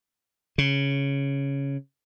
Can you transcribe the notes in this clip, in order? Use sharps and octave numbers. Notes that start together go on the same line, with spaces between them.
C#3